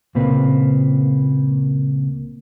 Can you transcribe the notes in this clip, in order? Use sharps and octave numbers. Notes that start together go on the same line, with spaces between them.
C#2 A#2 A#3 C4 B4